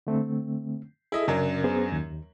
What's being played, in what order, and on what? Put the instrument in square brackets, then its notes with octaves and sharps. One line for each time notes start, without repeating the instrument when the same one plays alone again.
[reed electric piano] D3 A3 C4
[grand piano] E4 D#5 E5 [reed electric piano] G#4 A4
[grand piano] F#2 F#3 D4 [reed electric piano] C#3 A#4
[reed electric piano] B3 G#4 C5
D#2